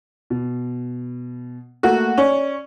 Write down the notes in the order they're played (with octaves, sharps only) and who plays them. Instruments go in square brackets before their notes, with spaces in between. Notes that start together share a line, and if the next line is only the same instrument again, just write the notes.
[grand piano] B2
[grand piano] A3 A#3 A4 [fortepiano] F#4
[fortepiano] C#4 [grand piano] D5 C#6